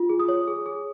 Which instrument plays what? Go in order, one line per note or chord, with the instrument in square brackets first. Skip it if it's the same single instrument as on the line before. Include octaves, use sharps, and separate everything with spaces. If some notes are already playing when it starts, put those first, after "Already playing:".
Already playing: [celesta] F4
G#4
D#6
C#5
G#4
G#4